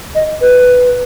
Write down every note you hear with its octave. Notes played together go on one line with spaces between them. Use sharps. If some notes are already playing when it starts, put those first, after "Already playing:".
D#5
B4